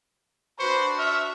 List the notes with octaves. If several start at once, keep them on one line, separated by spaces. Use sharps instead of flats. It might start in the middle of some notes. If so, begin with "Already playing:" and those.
D4 F#4 B4 C5 C#6
E5 C#6 F6